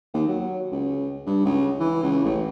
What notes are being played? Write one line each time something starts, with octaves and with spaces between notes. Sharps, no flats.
D#2
F#3
C#2
G2
C#2
E3
C#2
A1